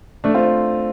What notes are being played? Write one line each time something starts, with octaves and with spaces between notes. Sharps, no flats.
A3 D4
C4 F4